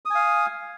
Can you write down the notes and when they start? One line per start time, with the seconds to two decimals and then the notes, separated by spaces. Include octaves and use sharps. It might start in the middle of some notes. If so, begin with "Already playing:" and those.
0.05 D#6
0.10 G#5
0.15 F5